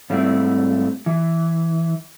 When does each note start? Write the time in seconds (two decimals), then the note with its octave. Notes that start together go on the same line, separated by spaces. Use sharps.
0.10 G#2 G3 A3 C4 E4
1.06 E3